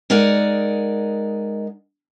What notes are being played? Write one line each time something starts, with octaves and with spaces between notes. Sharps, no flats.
G#3 D#4 A#4 D5 F#5